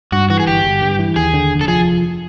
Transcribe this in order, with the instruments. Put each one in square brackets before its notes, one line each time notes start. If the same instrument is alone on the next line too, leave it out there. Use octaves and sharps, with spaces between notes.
[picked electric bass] G2 [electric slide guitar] F#4
[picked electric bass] E3 [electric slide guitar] F#4
[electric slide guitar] G#4
[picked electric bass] G1 [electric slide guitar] G4
[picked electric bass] G1
G2
E3
[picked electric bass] D#2 [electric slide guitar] G#4
[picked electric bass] D3
F1
[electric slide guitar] A4
[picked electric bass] F3 [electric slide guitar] G#4